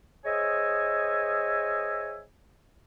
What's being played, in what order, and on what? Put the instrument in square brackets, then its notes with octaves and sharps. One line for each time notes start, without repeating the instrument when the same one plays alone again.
[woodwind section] G#4 C5 C#5 D#5 E5 G#5